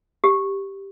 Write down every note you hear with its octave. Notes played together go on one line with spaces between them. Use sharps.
G4